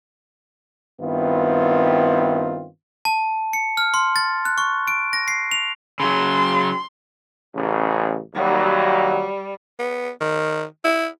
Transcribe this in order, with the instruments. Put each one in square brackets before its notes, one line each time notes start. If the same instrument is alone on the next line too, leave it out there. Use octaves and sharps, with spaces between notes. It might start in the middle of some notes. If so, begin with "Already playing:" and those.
[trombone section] G2 D#3 B3 C4 E4 F4
[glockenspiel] A5
C#7
F6
C6
A6
F#6
C#6
D7
A#6
C7
F7
[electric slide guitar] C#3 F#3 [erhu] C6
[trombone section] A1 C#3
[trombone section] D#2 F#3 [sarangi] G3
[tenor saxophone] B3
D#3
E4